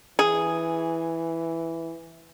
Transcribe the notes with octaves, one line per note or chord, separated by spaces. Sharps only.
E3 G#4